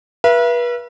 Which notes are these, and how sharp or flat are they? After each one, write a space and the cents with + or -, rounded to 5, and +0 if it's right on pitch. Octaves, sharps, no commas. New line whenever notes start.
B4 -35 E5 +40